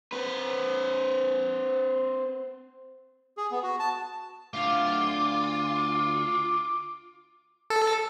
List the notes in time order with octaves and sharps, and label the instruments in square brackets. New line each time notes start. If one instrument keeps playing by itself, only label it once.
[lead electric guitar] C4 B4
[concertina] G#4
B3
F#4
A5
[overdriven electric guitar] D2 F5 [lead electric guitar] F4 [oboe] D6
[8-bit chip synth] A4